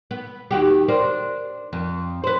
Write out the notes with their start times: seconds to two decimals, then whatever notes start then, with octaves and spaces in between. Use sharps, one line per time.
0.11 B3
0.51 D#2 F#4 G4
0.88 D4 A#4 C5
1.73 F2
2.24 B4 C5